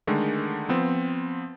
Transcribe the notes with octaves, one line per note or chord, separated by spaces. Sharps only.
D3 D#3 G#3 A3
F3 B3 C4